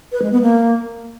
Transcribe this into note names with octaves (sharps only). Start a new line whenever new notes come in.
B4
G#3
B3
A#3